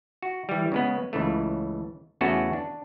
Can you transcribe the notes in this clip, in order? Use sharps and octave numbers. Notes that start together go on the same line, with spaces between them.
F#4
E3 G3
C#3 G#3 B3
C#2 C#3 E3 A3
E2 C#3 A3 B3 C#4 F#4
D4